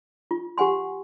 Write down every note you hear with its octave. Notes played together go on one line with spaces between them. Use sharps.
F4
G4 F#5 G#5 C6